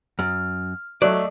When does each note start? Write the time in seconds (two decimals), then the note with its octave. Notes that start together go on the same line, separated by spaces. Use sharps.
0.19 F#2 F6
1.02 F#3 A3 A4 D5 D#5